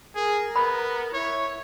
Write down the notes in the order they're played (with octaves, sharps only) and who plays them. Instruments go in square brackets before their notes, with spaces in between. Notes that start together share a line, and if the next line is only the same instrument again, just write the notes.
[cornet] G#4 [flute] A#4
[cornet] B3 [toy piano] B5
[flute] E4 [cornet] C#5